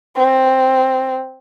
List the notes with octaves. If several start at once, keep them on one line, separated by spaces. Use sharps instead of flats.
C4